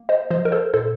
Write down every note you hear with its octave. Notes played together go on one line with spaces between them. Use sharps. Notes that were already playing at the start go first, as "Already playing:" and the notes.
Already playing: A#3
C5 D#5
F3 C5 D#5
A#4
A4 C5
A#2 A4 C5